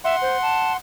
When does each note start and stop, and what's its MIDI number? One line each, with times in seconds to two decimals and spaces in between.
0.05 0.16 76
0.05 0.77 78
0.05 0.77 84
0.22 0.38 72
0.42 0.72 81